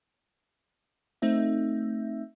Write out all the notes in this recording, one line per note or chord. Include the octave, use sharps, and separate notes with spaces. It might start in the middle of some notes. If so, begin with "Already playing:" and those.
A3 C4 D#4 E5